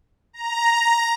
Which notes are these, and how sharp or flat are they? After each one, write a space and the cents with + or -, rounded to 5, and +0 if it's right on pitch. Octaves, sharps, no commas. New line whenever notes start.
A#5 +5